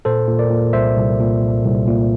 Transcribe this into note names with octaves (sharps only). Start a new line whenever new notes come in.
A#2 A4 C5
A#2
A#4 D5
A#2
C2 C5 E5
C2
A#2
C2
C2
A#2